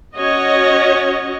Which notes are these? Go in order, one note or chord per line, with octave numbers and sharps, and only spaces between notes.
C#4 F#4 C#5 D#5